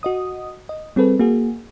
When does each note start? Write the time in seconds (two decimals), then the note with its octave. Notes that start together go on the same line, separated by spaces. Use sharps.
0.03 F#4 D#5 D#6
0.69 D#5
0.96 G3 C4 G#4 A4 B4
1.19 A#3 F#4 G#4